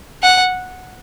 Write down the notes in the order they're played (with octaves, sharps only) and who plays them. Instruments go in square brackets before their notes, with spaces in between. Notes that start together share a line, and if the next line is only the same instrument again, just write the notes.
[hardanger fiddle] F#5